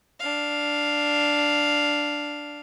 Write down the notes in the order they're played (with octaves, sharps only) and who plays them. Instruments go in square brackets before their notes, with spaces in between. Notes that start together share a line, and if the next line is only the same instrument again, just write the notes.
[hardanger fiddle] D4 F5